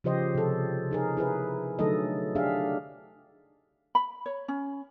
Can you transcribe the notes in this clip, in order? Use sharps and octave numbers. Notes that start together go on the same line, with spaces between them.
C#3 F3 G4 C5 D#5
C3 A4
D#4 G#4 A#4
E4 G#4 B4
D3 F#3 A3 D#4 A4 D#5
A3 D4 G4 G#4 E5 F5
B5
C#5
C#4